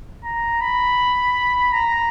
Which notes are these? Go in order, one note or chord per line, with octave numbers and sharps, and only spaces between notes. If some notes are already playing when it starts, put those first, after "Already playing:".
A#5
B5
A#5